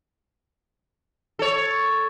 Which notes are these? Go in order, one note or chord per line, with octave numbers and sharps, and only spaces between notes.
A4 C#5